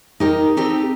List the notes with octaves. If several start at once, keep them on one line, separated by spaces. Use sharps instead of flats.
D#4 G4 A#4
C4 D#4 G4 A4